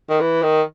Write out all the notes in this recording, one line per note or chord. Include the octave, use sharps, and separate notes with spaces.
D#3
E3
D#3